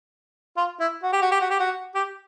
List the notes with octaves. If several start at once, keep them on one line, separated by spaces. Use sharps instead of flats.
F4
E4
F#4
G4
F#4
G4
F#4
G4
F#4
G4